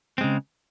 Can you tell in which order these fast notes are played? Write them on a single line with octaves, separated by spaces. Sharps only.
C4 G#3 C#3